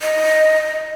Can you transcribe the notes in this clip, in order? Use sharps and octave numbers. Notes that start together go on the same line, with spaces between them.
D#5